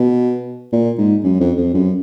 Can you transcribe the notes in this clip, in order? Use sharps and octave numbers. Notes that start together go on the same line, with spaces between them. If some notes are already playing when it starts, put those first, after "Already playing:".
Already playing: B2
A#2
G#2
F#2
F2
F2
F#2